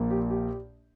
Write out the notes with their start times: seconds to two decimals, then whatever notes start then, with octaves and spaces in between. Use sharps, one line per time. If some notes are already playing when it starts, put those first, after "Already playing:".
Already playing: A#1 A#2 A#3
0.11 G4
0.30 G4